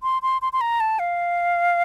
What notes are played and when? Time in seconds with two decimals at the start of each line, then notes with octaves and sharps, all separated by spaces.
0.03 C6
0.22 C6
0.42 C6
0.53 C6
0.61 A#5
0.80 A5
0.99 F5